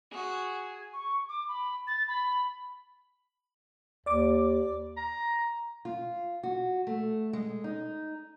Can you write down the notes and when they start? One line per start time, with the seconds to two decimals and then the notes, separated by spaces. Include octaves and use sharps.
0.12 F#4 G#4
0.93 C#6
1.29 D6
1.48 B5
1.87 A6
2.08 B5
4.06 D#2 D5 D6
4.97 A#5
5.85 F4
6.43 F#4
6.87 A3
7.33 G#3
7.64 D#4